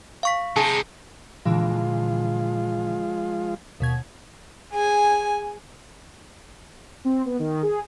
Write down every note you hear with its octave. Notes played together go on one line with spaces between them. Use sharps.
F5 C#6 B6
C3 D#4 G#4 A5
A#2 D3 E3 F3 G#3 F4
D#2 B2 G#6
G#4 G#5
C4
B3
D#3
G#4